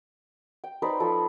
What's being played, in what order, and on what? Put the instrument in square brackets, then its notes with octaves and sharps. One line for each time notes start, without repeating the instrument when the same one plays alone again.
[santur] G5
D#4 B4 C5 D5
F3 A4